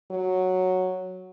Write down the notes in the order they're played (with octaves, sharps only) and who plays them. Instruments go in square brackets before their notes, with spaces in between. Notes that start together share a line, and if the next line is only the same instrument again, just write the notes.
[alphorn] F#3